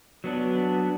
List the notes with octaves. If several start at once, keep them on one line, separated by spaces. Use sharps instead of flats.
F#3 B3 D4